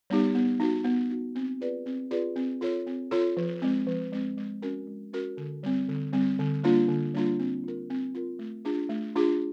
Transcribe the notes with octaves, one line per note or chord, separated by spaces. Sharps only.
G3 B3 D#4 G4
B3
D#4 F#4
B3
D#4 F#4
C4
F4 G#4 B4 D5
C4
F4 G#4 B4 D5
C4
F4 A4 C#5
C4
F4 A4 C#5
F3
G#3 C4
F3
G#3 C4
G#3
C#4 F#4 A#4
G#3
C#4 F#4 A#4
D3
G3 C4
D3
G3 C4
D3
G3 A#3 D4 F4
D3
G3 A#3 D4 F4
C4
F4 A#4
C4
F4 A#4
A3
D4 F4 G#4
A3
D4 F4 G#4